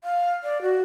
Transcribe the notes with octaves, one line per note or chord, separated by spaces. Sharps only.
F5
D5
F#4